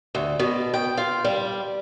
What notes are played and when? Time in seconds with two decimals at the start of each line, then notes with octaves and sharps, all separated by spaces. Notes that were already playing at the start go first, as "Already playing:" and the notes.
0.15 D2
0.39 B2
0.74 G5
0.98 F4
1.24 G3